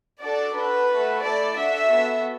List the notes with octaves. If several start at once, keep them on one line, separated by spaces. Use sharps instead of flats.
D4 F#4 A4 D5
D4 F#4 A4 B4
A3 F#4 A4
A3 E4 A4 D5
D4 F#4 A4 E5
B3 F#4 A4